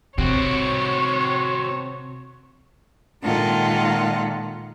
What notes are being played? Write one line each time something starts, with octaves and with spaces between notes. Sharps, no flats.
C3 C4 F#4 C#5
A#2 D#3 G#3 F4 A4 F#5